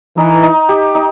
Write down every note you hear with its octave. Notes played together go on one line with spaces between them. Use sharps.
E3 D#4
D#4
G4
D#4